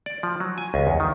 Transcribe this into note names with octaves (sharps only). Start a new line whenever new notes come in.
D5
F3
F#3
G#5
C#2
E2
D#3